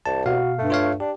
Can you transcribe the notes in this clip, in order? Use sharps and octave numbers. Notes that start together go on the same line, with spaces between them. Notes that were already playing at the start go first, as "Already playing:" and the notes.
C2 A5
B2 F#4 F5
G2 A3
F4 C#5 F5
D4 G4